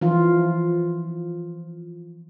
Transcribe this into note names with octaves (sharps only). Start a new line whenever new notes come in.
E3 F3 F4